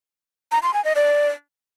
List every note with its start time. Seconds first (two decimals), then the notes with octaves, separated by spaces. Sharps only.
0.52 A#5
0.63 C6
0.74 G#5
0.85 D#5
0.96 D5